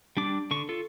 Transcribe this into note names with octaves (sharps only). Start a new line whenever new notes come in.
G3 D4 D6
D3 C#6
F4 A4